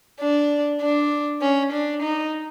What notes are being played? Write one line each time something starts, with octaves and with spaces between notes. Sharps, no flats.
D4
D4
C#4
D4
D#4